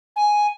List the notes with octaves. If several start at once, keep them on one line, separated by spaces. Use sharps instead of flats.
G#5